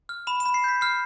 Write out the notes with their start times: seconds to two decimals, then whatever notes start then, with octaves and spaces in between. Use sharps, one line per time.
0.09 F6
0.27 B5 E7
0.40 E7
0.46 B5
0.54 C7
0.64 G6 B6
0.81 F6 C7